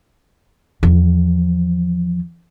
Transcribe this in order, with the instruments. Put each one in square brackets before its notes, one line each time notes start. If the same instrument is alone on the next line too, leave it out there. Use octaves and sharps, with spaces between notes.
[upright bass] E2 F3